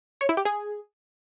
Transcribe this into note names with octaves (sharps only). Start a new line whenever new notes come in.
C#5
E4
G4
G#4